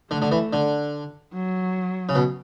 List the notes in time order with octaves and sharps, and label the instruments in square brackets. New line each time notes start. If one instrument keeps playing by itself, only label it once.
[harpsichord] D3 [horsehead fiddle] A3
[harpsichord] D3
E3
D3
[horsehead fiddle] F#3
[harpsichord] C#3
B2